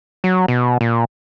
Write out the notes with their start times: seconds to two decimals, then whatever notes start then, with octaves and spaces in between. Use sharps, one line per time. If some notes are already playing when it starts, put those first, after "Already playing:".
0.24 F#3
0.48 B2
0.81 A#2